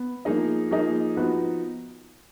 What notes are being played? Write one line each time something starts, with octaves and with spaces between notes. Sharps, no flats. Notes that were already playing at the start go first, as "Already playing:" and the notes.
Already playing: B3
F3 A#3 D#4 G#4 D#5
F3 A#3 D#4 G#4 D#5
F3 B3 D#4 F#4 B4